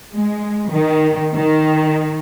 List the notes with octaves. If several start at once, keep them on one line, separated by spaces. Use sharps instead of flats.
G#3
D#3
D#3